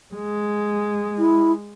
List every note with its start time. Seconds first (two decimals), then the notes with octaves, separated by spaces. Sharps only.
0.14 G#3
1.18 E4